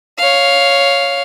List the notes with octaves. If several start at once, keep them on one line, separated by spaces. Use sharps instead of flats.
C#5 F5